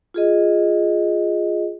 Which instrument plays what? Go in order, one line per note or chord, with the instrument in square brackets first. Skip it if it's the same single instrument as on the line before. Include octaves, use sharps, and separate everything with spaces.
[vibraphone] F4 G#4 D#5